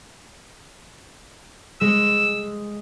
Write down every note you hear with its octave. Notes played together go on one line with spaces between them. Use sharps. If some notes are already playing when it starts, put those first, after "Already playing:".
G#3 E6